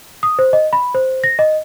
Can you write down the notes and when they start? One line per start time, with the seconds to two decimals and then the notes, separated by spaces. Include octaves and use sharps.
0.23 D#6
0.39 C5
0.53 D#5
0.73 B5
0.94 C5
1.24 A#6
1.39 D#5